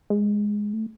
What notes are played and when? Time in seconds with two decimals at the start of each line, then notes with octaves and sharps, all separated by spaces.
0.10 G#3
0.73 A3